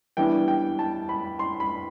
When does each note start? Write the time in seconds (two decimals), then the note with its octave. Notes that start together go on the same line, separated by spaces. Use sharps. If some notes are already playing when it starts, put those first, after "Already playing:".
0.17 E3 G3 B3 D4 G5
0.48 G5
0.79 A5
1.09 B5
1.39 C6
1.60 B5